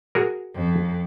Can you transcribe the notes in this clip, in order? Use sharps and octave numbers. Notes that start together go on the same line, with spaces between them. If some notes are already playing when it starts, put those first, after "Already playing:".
F#4 G#4 A#4
F2